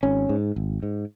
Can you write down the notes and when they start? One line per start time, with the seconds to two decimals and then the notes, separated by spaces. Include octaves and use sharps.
0.03 G#1 C#4
0.29 G#2
0.56 G#1
0.83 G#2